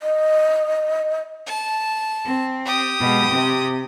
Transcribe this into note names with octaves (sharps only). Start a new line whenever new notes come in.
D#5
A5
C4
G4 D#6
B2 G#3
C3 C4